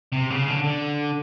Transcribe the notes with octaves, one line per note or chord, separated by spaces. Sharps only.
C3
C#3
D3
D3